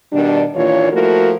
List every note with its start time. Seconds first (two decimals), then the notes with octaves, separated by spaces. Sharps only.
0.13 B2 D#3 G3 D4
0.55 D#2 A#2 E3 D4 F4 C#5
0.92 F3 A3 A#3 E4 F#4 A#4